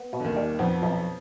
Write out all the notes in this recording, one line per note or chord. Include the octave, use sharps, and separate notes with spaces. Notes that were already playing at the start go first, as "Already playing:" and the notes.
Already playing: B3
B2
D3
D#2 D#3
G3
F2 F3 B3
B1 F2 F3